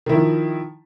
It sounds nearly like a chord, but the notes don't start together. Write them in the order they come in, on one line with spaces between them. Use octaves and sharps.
D#3 E4 F3